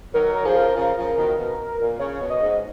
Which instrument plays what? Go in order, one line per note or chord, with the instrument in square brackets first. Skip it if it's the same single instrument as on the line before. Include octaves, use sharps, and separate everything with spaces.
[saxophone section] D#3 F#3 [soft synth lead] A#4
[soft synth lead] A#4
[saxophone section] C#3 F3 [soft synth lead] G#4
[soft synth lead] A#4
[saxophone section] C#3 F3
C#3 F3
B2 D#3
B2
A#2
[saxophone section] C#3 [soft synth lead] C#5
[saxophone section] B2
[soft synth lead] D#5
[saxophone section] G#2